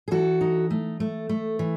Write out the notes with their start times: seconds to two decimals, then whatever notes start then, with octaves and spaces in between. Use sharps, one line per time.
0.08 G#4
0.11 E3 F#4 A4
0.41 D#4
0.71 A3
1.00 A3
1.29 A3
1.59 E3